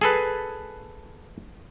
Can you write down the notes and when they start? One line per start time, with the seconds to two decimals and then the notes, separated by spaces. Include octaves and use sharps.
0.01 G#4 A4 B4